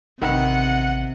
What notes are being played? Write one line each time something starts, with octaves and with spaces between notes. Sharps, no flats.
A1 C3 D#3 B3 F#5